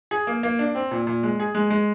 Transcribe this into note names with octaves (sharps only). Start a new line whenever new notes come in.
G#4
A#3
A#3
D4
C4
A#2
A#2
G#3
G#4
G#3
G#3